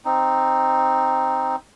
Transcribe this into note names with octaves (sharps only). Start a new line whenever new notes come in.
C4 D#4